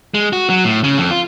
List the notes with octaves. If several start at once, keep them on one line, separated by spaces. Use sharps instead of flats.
G#3
F#4
F#3
A2
C#3
F2
F4